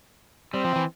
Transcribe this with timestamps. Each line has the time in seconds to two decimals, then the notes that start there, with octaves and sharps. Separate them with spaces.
0.54 G3 C4
0.64 F3
0.76 E3